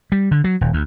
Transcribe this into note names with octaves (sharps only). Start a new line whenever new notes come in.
G3
D3
F#3
D#1
D2